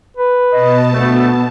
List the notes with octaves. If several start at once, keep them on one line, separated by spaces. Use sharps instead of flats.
B4
B2 D#5 A5
D2 A3 B3